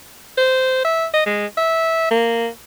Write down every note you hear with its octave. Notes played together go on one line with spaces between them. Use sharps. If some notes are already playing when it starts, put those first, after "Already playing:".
C5
E5
D#5
G#3
E5
A#3